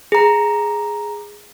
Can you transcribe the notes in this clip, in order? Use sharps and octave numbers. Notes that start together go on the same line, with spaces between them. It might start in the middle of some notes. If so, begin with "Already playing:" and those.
G#4 A#5